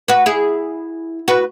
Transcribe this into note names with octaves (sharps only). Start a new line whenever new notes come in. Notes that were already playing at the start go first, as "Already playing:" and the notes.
F#4 B4
E4 G#4
F#4 B4